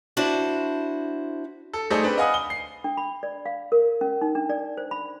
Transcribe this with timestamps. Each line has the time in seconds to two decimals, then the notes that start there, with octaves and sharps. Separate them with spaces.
0.17 D4 E4 F#4 C5
1.73 A4
1.91 A3 D#4 G#4 A4 C5 D5
2.03 C4 D4 B4
2.17 D#5 F5 F#5 G#5 B5 D#6
2.34 G7
2.50 C7
2.84 D4
2.97 B5
3.23 D5
3.46 F5
3.72 A#4
4.01 C#4
4.22 D#4
4.35 D4
4.50 D5
4.77 C5
4.91 B5